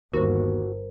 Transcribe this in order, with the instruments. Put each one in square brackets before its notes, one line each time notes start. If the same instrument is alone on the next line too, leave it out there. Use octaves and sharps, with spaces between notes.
[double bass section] G1 [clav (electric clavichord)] D#2 [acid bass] F#4 [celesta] A#4 C5